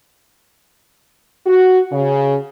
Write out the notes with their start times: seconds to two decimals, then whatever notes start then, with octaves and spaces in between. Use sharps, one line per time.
1.46 F#4
1.92 C#3